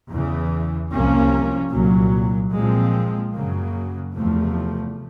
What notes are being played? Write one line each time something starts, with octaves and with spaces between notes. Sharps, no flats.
E2 C#3 E3
C2 C3 F3 A#3 C#4
C2 A#2 F#3
A#2 F3 G#3 C4
F#2 C#3 F#3 A#3
E2 C3 F3 A3